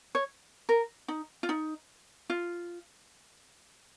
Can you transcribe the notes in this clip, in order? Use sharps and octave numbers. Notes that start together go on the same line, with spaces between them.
C#5
A#4
D#4
F4
D#4
F4